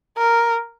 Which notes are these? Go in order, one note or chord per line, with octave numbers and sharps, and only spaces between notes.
A#4